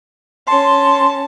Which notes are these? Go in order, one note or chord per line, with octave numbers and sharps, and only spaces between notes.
C#4 A5 C6